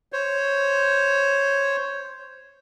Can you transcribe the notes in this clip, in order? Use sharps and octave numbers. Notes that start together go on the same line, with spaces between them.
C5 C#5